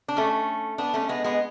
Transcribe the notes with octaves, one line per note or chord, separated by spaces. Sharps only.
D4
A3 C#4
B3 D4
A3 C#4
G#3 B3
G#3 B3